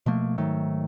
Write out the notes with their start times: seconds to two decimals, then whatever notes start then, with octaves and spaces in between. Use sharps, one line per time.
0.06 B2 F3 A3 A#3
0.38 G#2 D#3 F#3 A3